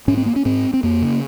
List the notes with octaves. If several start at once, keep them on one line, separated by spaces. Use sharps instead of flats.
G#2 C#4
C4
A#3
C#4
G#2 C4
C4
F2 A#3
C#3